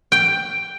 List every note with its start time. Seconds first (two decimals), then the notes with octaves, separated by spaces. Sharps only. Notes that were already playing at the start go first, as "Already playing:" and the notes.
0.12 G5